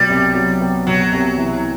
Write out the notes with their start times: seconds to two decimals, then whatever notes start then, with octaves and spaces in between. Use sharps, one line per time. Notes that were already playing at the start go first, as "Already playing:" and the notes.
Already playing: B2 F#3 G3 B3
0.10 C2
0.35 F#3
0.61 B3
0.87 B2 F#3
1.12 C2
1.38 E3